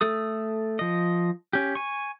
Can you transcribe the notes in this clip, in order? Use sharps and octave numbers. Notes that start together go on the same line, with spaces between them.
A3 A4 D#6
F3 D#5
C#4 G4
G#5 C#6